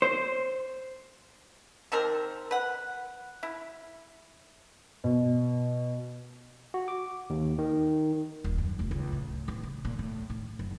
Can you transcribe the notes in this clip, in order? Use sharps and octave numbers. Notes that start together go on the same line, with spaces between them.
C5
D#3 C4 D4 A#4
B4 F#5
E4
B2
F#4
D6
D#2
D#3
D#1
F#2
F1
C#2
A2
A1
C#3
A#2
A2
A2
F#1